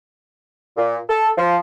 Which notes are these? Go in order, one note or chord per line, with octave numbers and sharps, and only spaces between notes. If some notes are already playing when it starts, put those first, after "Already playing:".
A#2
A4
F3